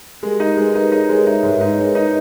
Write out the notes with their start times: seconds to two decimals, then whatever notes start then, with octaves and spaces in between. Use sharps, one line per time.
0.23 G#3 G4 A#4
0.40 D#4
0.57 G#3 B4
0.67 A#4
0.75 D#4 G#4 B4
0.92 D#4 A#4 C#5
1.09 G#3
1.26 D#4 C#5 E5
1.43 G#2
1.61 D#4 B4 D#5
1.78 G#3 A#4 C#5
1.95 D#4 B4 D#5